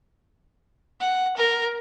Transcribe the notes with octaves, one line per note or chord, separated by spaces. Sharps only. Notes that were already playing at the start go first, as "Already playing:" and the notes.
F#5
A#4